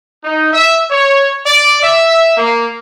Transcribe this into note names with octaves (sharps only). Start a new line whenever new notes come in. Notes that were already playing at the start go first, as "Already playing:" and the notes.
D#4
E5
C#5
D5
E5
A#3